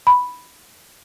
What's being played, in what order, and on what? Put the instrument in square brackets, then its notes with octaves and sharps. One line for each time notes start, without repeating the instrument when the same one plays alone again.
[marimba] B5